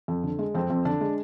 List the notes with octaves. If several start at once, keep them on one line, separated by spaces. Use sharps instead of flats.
F2
D3
G#3
F2 C4
F2
D3 D4
G#3